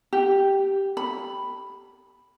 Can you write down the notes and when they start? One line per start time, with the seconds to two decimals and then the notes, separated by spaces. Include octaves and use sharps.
0.13 G4
0.97 B5